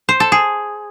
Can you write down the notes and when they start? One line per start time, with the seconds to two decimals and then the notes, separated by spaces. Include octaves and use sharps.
0.09 C5
0.20 A4
0.32 G#4